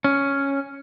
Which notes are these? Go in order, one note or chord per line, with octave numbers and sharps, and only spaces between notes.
C#4